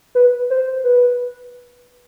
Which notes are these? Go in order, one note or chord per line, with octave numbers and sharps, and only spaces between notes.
B4
C5
B4